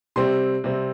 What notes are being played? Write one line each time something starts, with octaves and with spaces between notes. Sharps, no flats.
C3 G3 C4 C6
C3 G3 C4